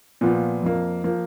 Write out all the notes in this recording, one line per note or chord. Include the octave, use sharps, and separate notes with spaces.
A#2 F3 B3 F4
F2 F3 A#3
F3 A#3